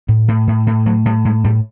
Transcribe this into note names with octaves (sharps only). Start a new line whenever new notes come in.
A2
A2
A2
A2
A2 F#3
A2 G3
A2 G#3
A2 G3